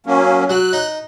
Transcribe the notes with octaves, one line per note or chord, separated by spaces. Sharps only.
F#3 A#3 C#4
F#3 F#6
D#4